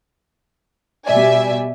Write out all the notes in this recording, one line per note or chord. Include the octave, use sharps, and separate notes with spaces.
B2 G3 D5 E5 G#5